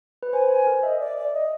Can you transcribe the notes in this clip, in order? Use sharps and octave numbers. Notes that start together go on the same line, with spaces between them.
B4
C5 G#5
C5 G#5
A#4
D#5 E5
D5
D5
D#5